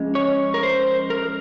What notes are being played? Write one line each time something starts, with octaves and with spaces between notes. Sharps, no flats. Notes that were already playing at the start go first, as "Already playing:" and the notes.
Already playing: F3 G#3 C#4
C#5
A#4
C5
A#4